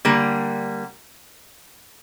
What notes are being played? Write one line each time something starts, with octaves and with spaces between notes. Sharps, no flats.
D3 G3 A#3